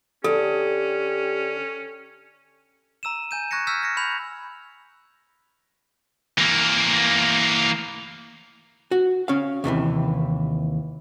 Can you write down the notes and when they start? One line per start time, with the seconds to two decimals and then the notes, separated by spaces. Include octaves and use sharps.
0.24 D3 C#4 G4 A4
3.03 A#5 E6 D#7 E7
3.31 G#5 G6 D#7
3.51 C#6 F#6 G#6 A#6 C#7
3.67 E6 F6 G6 G#6 B6
3.83 G#6 A#6 C#7
3.97 B5 G6 F7
6.38 E3 A#3
8.91 F#4
9.28 C#4 F5
9.64 D#2 C3 D#3 E3